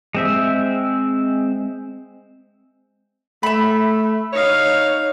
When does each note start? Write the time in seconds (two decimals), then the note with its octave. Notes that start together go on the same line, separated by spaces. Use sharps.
0.15 G#3 C4 E5
3.43 A3 E5 B5
4.33 D#4 C#5 F5